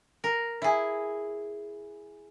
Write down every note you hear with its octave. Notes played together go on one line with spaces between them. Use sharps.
A#4
E4 G#4